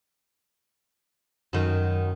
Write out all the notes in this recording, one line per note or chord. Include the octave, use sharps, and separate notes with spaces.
F#2 D#3